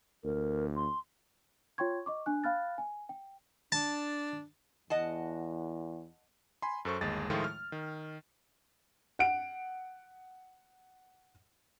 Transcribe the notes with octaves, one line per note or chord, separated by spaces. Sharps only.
D2 A#4
C6
F4 C#5 G5 C6 C#6 G#6
D#5 C#6 D6
D4 G#5 F#6
F5 G5 B5 F6 F#6 A6
G#5
G5
D4 A5
E2 D#5 F#5 A5
G#5 B5 C6
F#2 A4 C5 C#6
G1 D#2 G#3 A6
A2 D#3 F3 G#3 A3 F4
F6
D#3
F#5 D7